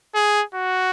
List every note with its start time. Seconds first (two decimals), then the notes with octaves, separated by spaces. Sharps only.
0.15 G#4
0.55 F#4